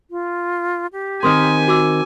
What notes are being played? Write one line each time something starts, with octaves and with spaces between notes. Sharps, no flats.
F4
G4
D#3 C4 A#4 G#5 C6 D#6 F6
F#4 D6 E6